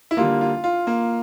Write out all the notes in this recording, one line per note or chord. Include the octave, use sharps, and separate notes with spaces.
E4
D3 G3 A#3 F4
F4
F4
A#3